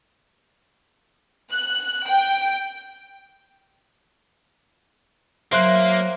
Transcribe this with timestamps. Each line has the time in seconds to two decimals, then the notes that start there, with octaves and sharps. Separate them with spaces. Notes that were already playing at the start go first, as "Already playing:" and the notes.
1.52 F#6
2.08 G5
5.52 F#3 A#3 C5 E5 F#6